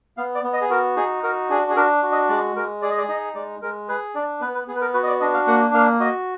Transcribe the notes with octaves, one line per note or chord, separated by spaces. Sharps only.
B3 F5
D5
B3
D#5
G#4
F#4 A#4
D#4 G#4
F#4 A#4
D4 G#4
G#4
D4 A#4
F#4
D#5
G#3 D5
G#3 A#4
G#4 D5
D#5
D5
D#4 D#5
G#3 D5
G#3 A#4
G#4 B4
D4 D5
B3 B4
B4
B3 G#4
B4
A#4
F#4 B4
D#5
D5
D4 D#5
F5
A#3 F#5
A#3 F5
F#4 D#5